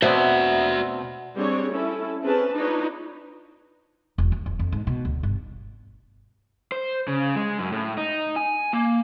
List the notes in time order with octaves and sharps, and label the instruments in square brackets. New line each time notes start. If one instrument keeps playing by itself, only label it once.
[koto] B2 [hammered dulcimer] A3 B3 C4 [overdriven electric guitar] F#4 E5 [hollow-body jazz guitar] C5 D5
[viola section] G3 C4 D4 G#4 C#5
C#4 E4 A4
C4 C#4 G#4 B4 A5
D4 D#4 F4 B4 C#5
[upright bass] E1
D#2
F2
F2
G#2
B2
D2
G1
[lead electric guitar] C5
C#3
G#3
F#2
A2
D#4
G#5
A#3